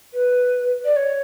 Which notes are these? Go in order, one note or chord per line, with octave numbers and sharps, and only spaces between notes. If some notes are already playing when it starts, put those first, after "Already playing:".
B4
D5
C#5